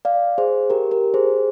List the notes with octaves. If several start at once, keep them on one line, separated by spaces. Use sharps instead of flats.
D5 F5
G#4 C5
G4 A#4
G4 A#4
G#4 C5